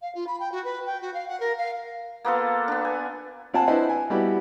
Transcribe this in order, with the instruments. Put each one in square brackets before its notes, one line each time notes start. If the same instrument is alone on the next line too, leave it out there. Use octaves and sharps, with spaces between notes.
[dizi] F5
F4
B5
G5
F#4
B4
G5
F#4
F5
F#5
A#4
F5
[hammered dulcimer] A#3 B3 F4 A4
B3 D4
G#5
[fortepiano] C4 F4 C5 F#5 G#5 A5
D4 E4 B4 C5 D#5
G#5
G3 B3 E4 F#4 G4